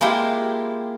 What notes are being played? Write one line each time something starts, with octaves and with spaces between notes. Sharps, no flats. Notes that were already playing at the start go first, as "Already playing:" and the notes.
G#3 A#3 E4 F4 G4